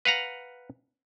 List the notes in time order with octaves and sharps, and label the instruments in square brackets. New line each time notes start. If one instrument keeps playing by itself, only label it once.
[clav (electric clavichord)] B4 F5 F#5 A#5